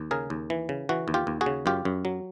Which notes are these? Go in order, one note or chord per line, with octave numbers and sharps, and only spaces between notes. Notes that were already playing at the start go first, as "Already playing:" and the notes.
Already playing: D#2
C#3 G#4 A#4
D#2
E3
C#3
E3 F#4
D#2
F4 G4
D#2
F#4 G#4
C#3
F#2 F4 G4
F#2
F#3